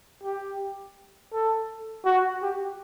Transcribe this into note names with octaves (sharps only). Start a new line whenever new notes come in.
G4
A4
F#4
G4